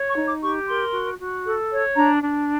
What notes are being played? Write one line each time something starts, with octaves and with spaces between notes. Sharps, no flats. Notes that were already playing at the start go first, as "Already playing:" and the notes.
Already playing: C#5
C#6
D#4
D6
G4 C#6
A#4 C6
F#4
F#4
A4
C#5
D4 A#5
D4